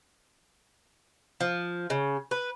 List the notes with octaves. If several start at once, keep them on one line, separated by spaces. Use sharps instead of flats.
F3
C#3
B4